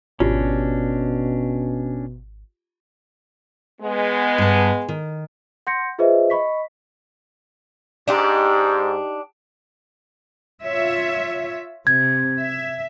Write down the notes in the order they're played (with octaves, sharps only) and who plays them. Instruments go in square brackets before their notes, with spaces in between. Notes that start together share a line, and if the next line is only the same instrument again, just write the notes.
[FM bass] G#1 [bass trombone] B2 [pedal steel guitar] C#4 D4 [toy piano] F4 G4
[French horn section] G#3 B3
[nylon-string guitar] G2 A5
D#3
[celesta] F#5 C6 G6 A#6 C#7
F4 G#4 B4 C5 D#5 E5
D#5 B5 C#6 B6
[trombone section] G#2 [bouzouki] D4 D#4 G4
[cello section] F4 C#5 E5
[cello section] C3 [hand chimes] G#6
[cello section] E5